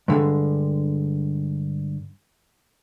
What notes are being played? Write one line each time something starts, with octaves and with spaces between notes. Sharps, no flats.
G2 D3 G#3